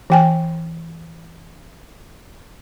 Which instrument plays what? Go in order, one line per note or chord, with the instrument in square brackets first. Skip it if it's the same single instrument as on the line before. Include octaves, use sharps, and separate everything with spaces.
[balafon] E3 G5 G#5